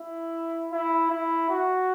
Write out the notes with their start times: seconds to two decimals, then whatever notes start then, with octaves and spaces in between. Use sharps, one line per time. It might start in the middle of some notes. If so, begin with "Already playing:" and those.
Already playing: E4
0.72 E4
1.10 E4
1.49 F#4